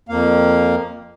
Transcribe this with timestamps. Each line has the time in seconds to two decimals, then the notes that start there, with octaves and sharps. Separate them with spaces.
0.09 F2 A#3 F5